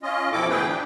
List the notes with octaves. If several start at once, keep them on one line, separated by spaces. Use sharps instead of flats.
C#4 F4 D#5
F2 B2 C4 E4 A4 D6
D2 G#2 E3 G#4 B4 G5
D4